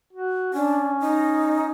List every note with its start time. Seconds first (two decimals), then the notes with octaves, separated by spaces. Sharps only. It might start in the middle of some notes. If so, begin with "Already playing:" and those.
0.13 F#4
0.54 C#4 D4
1.00 D#4